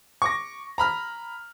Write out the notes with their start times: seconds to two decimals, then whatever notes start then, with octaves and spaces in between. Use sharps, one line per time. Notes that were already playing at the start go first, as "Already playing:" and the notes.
0.22 C#6 D6 A#6
0.78 A#5 B5 F6